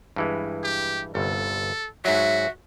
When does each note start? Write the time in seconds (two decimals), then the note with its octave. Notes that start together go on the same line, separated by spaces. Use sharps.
0.16 G2 E3 G#3
0.64 G4
1.15 G1 C2 A4
2.05 G#2 F#3 F#4 E5